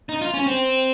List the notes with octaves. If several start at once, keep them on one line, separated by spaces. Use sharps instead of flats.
D#4
F4
C#4
C4